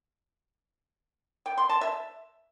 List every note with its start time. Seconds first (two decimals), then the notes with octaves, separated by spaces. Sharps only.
1.46 G5
1.58 C6
1.69 A5
1.81 E5